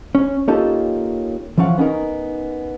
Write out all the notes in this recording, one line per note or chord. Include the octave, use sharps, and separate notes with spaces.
C#4
A#3 C#4 D#4 F4 G4 A4
E3 F3 C#4 F5 F#5
B3 C#4 D#4 A#4